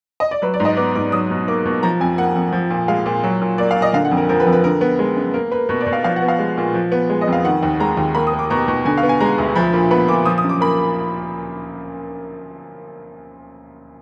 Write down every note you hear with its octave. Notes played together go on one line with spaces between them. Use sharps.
D#5
D5
F#3 B4
D5
G#2
D#5
B3 D6
G#2 D6
F#3 D#6
B2
A#3 D6
B2
F3 A#5
F2 G#5
A#3 F#5
F2
F3
A#2
G#3 F5
A#2
F#3
A#2
A#3 D5
F5
A#2
D#5
D3 F5
F#5
F2
A#4
F3 A#4
B4
F2
B4
D3 A#4
B3
G#3
F#2
A#3 A#4
A#3 B4
B2 B4
D5
B2
F5
F3 F5
F#5
B3
F5
G#3
A#2
F3
B3
G#3
D#5
F2 F5
D#3 F#5
D#2
G#3 A#5
D#2
A#3 B5
D#6
A#3
D6
B2 A#5
B2
D3 G#5
F5
B3
G#5
G#3 A#5
D2
F3 B5
A#2
B3 B5
A#2 D6
F3 D#6
D#6
F#2
D6
A#3 B5